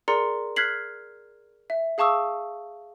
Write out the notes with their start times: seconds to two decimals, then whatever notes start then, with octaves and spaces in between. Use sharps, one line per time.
0.08 G#4 A#4 D5 A#5 C6 C#7
0.56 F6 F#6 G#6 B6 C7 F#7
1.70 E5
1.98 G#4 F5 A5 C#6 D#6 E6